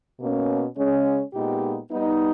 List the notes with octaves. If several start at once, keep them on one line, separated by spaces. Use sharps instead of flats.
B2 A#3 C#4
C#3 G#3 C#4
A#2 G#3 B3 D#4 G4
G3 B3 D#4